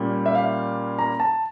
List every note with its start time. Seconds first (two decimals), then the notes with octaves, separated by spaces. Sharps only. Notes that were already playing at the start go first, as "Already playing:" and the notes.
Already playing: A#2 G3 A#3 C#4
0.26 E5
0.35 F5
0.99 A#5
1.20 A5